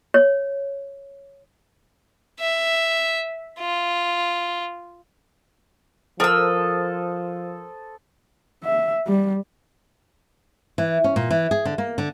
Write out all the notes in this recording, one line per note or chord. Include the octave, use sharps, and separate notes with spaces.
C#5
E5
F4
F3 A4 A#4 C5 D#6 E6
E5
G3
E3
C#4
A#2
E3
G#4
D3
A#3
D3